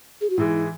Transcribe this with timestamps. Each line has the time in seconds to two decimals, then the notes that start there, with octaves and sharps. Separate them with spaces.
0.21 G#4
0.30 F#4
0.38 G#2 E3 G#3 E4